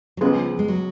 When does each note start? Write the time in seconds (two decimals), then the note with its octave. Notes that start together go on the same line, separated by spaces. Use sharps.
0.17 F#3
0.21 C#2 C#3 F3 G#3 B3
0.59 G#3
0.68 F#3